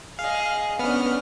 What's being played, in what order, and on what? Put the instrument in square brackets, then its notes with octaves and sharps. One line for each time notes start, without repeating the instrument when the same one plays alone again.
[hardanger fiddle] G#4 D#5 [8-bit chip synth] F5
[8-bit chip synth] B3 F6 [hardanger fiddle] C#4 D4